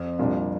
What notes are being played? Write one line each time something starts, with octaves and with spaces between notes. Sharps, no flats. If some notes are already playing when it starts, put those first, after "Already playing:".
Already playing: F2
C2 A#2 G3 D4